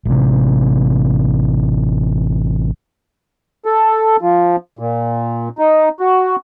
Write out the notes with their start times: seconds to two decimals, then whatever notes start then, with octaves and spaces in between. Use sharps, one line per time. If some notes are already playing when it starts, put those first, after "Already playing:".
0.05 A1 C3
3.65 A4
4.21 F3
4.79 A#2
5.58 D#4
6.00 F#4